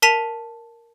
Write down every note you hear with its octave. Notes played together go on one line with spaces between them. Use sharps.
A#4 A5 B6 D#7 F7